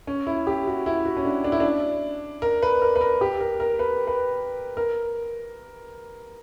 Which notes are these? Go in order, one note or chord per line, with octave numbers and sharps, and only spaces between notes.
C#4
E4
G4
F#4
E4
F#4
C#4
D4
D4
E4
D4
A#4
B4
A#4
B4
A#4
G4
A#4
A#4
B4
B4
A#4